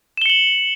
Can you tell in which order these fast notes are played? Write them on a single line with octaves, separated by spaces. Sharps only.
E7 G7 C#7 F#7